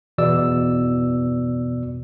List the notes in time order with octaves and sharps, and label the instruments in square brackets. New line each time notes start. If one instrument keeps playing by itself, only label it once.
[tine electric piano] E2 B2 D5 E6